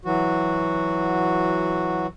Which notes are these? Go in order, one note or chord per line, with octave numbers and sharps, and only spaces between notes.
E3 F#3 F#4